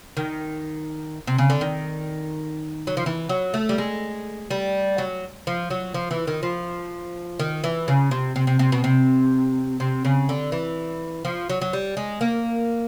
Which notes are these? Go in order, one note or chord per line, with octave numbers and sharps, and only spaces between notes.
D#3
C3
C#3
D3
D#3
F#3
F3
E3
F#3
A3
G3
G#3
G3
F#3
F3
F#3
F3
E3
D#3
F3
D#3
E3
C#3
C3
C3
C3
C3
B2
C3
C3
C#3
D3
E3
F3
F#3
F#3
G3
G#3
A#3